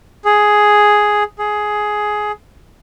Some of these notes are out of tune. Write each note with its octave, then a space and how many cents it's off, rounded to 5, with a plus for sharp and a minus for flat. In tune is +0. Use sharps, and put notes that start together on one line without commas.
G#4 +5
G#4 +10